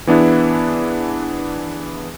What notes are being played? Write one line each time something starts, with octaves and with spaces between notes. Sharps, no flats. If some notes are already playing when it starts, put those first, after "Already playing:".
E3 B3 D4 E4 G#4